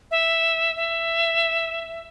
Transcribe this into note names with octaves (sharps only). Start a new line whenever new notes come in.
E5
E5